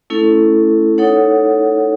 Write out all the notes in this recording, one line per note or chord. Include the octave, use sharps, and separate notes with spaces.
A3 C#4 E4 A4
D#4 A4 C#5 F#5